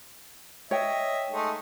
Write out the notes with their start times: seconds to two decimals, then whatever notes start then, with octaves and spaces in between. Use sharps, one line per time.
0.71 C#5 D#5 E5 G5
1.31 G#3 A3 D#4